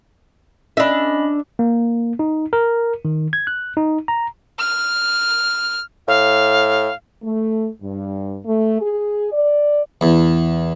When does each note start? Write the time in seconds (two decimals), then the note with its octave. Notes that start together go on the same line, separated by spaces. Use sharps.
0.77 C#4 D4 D#5 E5 B5
1.59 A#3
2.19 D#4
2.53 A#4
3.05 D#3
3.33 G#6
3.47 F#6
3.77 D#4
4.08 A#5
4.59 F6
6.08 A2 F5
7.23 A3
7.82 G2
8.45 A3
8.81 G#4
9.32 D5
10.01 E2